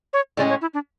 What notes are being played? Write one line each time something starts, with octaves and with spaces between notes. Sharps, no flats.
C#5
A2 G#3 C#4 G#4 D5
C#5
E4
D4